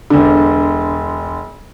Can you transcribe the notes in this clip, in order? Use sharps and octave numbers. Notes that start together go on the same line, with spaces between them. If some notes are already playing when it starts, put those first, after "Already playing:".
E1 D3